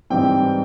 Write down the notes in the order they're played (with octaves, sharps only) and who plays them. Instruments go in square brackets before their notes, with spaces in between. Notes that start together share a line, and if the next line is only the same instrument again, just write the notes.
[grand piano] G#2 E3 G3 C4 G5